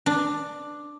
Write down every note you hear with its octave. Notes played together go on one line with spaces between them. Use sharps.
D4